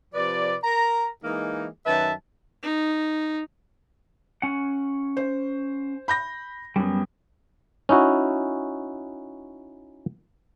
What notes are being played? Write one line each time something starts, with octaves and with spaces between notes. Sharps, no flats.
C3 F3 B4 D5
A#4 A#5
E3 G#3 A#3 D#4
F#2 D#3 B4 E5 A5
D#4
C#4 F#5
C5
B5 G6 A#6
F#2 G3 B3
C#4 D#4 E4 F#4